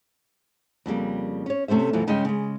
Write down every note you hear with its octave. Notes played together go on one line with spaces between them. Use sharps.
F2 C#3 G3 A#3
C#4 C#5
C3 A3 C#4 C5 E5
F#2 B2 E3 F3
G2 C#3 G#3 C#4 D#5 G5
C#3 G#3